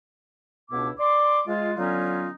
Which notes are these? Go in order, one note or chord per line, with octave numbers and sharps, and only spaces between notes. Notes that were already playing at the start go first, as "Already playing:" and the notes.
C#2 B2 B3 D4 E4 D6
D5 C6 D6
G#3 F4
D3 F#3 B3 C#4 D#4 F4